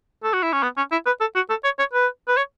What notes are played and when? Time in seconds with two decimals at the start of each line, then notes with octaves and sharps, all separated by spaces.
0.24 A4
0.34 F#4
0.43 E4
0.53 C#4
0.63 B3
0.77 C#4
0.92 E4
1.06 B4
1.21 A4
1.35 F#4
1.50 A4
1.64 C#5
1.79 C#5
1.93 B4
2.28 B4
2.37 C#5